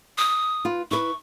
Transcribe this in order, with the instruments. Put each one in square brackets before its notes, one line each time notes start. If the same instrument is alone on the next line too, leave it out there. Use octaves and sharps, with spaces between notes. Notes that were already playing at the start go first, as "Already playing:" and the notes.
[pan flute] D#6
[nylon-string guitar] F4 B4
[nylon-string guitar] E4 B4 [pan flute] C#6